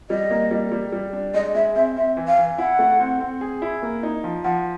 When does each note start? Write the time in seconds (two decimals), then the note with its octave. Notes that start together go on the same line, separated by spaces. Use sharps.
0.10 G3 D#5
0.30 A#3
0.51 G3
0.72 G3
0.92 G3
1.13 D4
1.34 G#3 D#5
1.55 G#3 E5
1.75 C4 E5
1.96 C4 E5
2.17 E3
2.27 F5
2.38 E3
2.58 E4 F#5
2.79 A3
3.00 C4
3.20 C4
3.41 G#4
3.62 E4
3.83 A#3
4.03 D#4
4.24 F3
4.44 F3 F#5